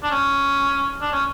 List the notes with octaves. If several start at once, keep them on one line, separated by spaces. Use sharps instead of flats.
D4
C#4
D4
C#4